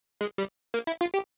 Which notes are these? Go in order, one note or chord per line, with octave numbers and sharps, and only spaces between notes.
G#3
G3
A#3
E4
F4
G4